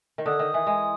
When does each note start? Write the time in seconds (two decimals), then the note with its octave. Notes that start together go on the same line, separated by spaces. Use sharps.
0.18 D#3
0.26 D3 D#6
0.39 D#3
0.54 E3
0.67 G#3